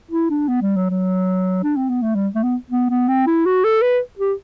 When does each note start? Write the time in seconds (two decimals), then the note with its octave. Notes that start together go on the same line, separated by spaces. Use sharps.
0.11 E4
0.30 D4
0.48 B3
0.62 G3
0.76 F#3
0.90 F#3
1.63 D4
1.76 C4
1.89 B3
2.02 A3
2.15 G3
2.35 A3
2.43 B3
2.70 B3
2.89 B3
3.08 C4
3.26 E4
3.45 F#4
3.64 A4
3.82 B4
4.19 G4